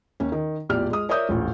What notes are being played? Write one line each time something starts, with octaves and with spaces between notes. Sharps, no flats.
D#2 C#4
D#3
A#1 E2 A2 G4 D5 F6
G#3 D#6
A#4 C#5 D5 E5 D#6 G6
D#1 A1 F2